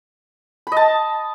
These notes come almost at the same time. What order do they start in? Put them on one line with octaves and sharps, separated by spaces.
B5 D#5 A5